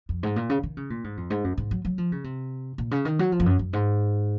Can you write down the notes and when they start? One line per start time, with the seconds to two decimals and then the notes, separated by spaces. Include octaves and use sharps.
0.09 F2
0.23 G#2
0.36 A#2
0.50 C#3
0.63 D#3
0.77 C#3
0.90 A#2
1.04 G#2
1.17 F2
1.30 G#2
1.44 F#2
1.57 G#2
1.71 F#3
1.85 F#3
1.98 F3
2.12 C#3
2.24 C3
2.78 A#2
2.91 C#3
3.05 D#3
3.19 F#3
3.32 F3
3.40 F2
3.46 F#2
3.59 F#2
3.73 G#2